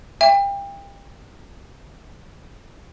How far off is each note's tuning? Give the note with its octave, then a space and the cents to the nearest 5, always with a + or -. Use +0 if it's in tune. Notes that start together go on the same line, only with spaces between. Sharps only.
E5 +10 G5 +30